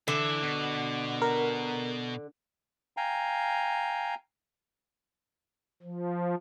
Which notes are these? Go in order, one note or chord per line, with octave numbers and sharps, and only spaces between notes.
D3 E3 E5
B2
A#4
F5 G5 G#5 A#5
F3